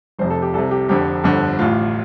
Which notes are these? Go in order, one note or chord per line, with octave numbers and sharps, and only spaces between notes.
F1 F2 C3 C5
A4
G4
C2 C3 A4
G4
F1 F2 D3 G4
G1 F2 D3
A1 A2 F4